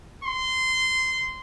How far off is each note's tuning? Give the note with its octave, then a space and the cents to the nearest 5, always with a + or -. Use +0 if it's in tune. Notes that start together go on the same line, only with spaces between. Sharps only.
C6 -15